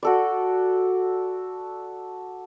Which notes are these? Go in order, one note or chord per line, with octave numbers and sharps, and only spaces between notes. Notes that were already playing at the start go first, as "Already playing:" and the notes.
F#4 A4 D5